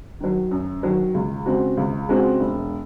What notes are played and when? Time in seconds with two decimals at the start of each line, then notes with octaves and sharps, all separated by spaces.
0.20 D#3 F#3
0.51 F#2
0.83 D#3 F#3
1.14 C#2
1.46 C#3 G#3 C4 F#4
1.77 C#2
2.09 C#3 G#3 C4 F#4
2.40 E1